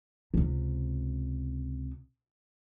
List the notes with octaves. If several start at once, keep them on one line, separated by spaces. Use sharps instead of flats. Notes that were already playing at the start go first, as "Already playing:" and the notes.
C#2 C3